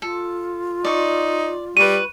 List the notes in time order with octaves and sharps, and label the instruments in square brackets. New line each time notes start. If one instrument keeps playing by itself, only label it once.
[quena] F4 [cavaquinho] A4
[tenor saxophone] D#4 [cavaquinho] D5 C#6
[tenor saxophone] G3 [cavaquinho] B4 C#6 [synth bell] D#7